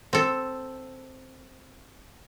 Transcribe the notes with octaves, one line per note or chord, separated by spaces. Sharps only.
C4 A4